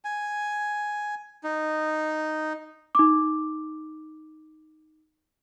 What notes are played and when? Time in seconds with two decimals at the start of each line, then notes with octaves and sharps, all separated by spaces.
0.05 G#5
1.43 D#4
2.95 D#4 D6